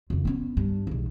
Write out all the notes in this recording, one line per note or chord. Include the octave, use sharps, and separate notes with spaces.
F2 C#3
B3 C#4
G2
B1 E2